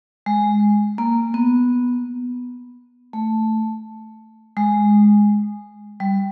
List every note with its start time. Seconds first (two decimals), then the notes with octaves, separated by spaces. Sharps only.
0.26 G#3
0.98 A#3
1.34 B3
3.13 A3
4.57 G#3
6.00 G3